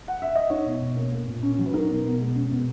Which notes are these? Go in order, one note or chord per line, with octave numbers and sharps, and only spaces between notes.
F#5
E5
D#5
D#4 C#5
B2
B2
A#3
A#3
A#2
C#4
F#3
B4
D#4 A#4
B2
B2
G#3
C#4
B2